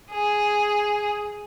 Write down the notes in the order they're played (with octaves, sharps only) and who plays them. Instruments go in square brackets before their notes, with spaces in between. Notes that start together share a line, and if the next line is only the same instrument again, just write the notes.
[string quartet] G#4